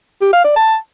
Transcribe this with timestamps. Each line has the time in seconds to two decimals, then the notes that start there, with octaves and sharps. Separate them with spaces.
0.22 G4
0.33 F5
0.44 D5
0.56 A5